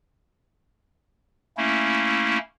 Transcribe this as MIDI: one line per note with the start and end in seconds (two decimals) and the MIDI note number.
1.57 2.38 57
1.57 2.38 58
1.57 2.38 61
1.57 2.38 64